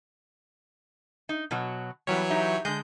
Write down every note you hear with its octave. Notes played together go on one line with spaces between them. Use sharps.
D#4
B2 F#3 F#4
E3 F#3 G3 B3 C#5
D#4 G4 E5
D3 G#3 G6